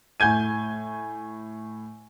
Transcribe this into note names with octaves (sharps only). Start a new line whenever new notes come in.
A2 G#5 G6 G#6 D#7